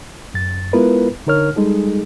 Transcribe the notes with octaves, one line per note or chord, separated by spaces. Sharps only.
F#2 A6
G#3 B3 E4 F4 A#4 B4
D3 D#4 A#4 C#5 F6
G3 G#3 D#4 G#4 A4